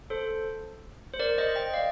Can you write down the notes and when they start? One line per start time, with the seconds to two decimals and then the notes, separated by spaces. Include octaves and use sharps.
0.10 A4 C5
1.14 C5
1.19 A#4 D5
1.38 C5 D#5
1.55 D#5 G5
1.74 D5 F5